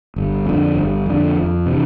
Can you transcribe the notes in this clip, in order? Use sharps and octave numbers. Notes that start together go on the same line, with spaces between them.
G1
F2 D3
G1
F2 D3
F2
C3 E3